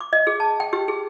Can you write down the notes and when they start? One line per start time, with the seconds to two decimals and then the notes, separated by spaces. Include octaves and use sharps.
0.01 D6
0.13 D#5
0.27 G#4
0.40 A5
0.60 G5
0.73 G4
0.88 G#4